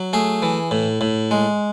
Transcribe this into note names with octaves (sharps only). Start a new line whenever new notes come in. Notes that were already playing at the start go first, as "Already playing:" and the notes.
Already playing: F#3
A3 G#4
E3
A2
A2
G#3